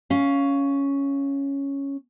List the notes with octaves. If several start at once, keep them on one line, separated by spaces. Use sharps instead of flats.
C#4 F5